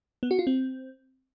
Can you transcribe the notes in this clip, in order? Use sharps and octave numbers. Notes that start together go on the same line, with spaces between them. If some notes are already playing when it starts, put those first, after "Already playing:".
B3
F#4
F4
C4